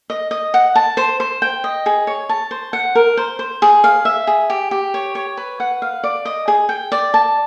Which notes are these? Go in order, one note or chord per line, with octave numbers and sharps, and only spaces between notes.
D#5
D#5
F#5
A5
C5
C5
G5
D#5
G#4
C#5
A5
C5
F#5
A#4
C5
C5
G#4
F5
E5
G#4
G4
G4
C#5
C#5
B4
F#5
F5
D5
D#5
G#4
G5
D5
A5